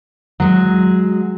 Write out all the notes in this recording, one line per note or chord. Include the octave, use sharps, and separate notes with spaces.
F#3 G#3